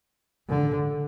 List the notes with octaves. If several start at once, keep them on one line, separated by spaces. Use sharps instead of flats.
D3